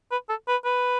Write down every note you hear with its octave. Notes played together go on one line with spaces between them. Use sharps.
B4
A4
B4
B4